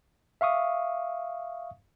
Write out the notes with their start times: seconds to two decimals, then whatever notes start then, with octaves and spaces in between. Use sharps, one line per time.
0.41 E5 F5 C#6 D#6